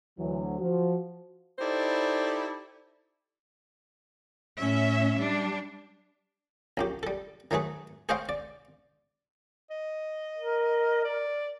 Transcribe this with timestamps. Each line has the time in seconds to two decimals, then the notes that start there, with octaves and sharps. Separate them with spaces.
0.19 D2 E3 F#3
0.59 F3 F#4
1.59 D#4 E4 G4 A4 C5 D5
4.59 A2 C#4 E5
5.17 G3 D4
6.77 A#1 F#2 G4
7.03 G3 A4
7.51 D#3 F#3 A3 G#4 B4
8.09 G#4 C5 C#5 D#5 F5 G5
8.29 D5
9.71 D#5
10.38 A#4
11.05 D5